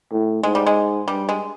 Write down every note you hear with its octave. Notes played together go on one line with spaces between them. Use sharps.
A2
G#2 G#3
G3
G#3
G2 G3
G#3